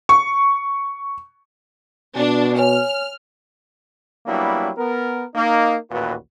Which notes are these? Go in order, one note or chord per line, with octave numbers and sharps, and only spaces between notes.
C#6
B2 D4
C#5 G#5 F6
F#3 G3 A#3 B3 D4 E4
B3 A#4
A#3 D#4
A1 D#2 A#2 F#4 B4